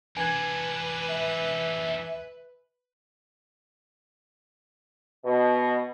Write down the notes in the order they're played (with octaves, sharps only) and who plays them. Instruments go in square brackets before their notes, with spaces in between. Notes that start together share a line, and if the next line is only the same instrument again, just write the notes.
[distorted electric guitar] E3 D4 [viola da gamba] B4 [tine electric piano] G#5 G#6
[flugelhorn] E5
[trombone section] B2